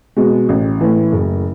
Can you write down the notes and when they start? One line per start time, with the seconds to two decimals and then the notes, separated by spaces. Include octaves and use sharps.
0.17 B2 G#3
0.49 A1
0.81 A2 E3
1.12 F#1